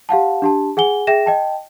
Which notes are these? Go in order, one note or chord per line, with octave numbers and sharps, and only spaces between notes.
G4 F5 F#5 A5
D4 G4 A5
G#4 F#5 G#5 G7
G#4 E5 G5 A#6 E7
D#5 G5 A5